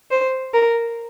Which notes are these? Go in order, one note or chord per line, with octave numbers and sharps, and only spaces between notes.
C5
A#4